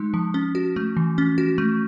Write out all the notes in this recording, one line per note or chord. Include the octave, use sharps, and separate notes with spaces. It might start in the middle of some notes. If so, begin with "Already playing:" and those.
Already playing: G#3 D#4
F3
C#4
F#4
A3
E3
C#4
F#4
A3